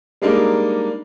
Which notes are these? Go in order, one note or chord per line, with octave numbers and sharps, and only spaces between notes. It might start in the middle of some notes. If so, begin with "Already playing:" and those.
G3 G#3 A#3 D4 D#4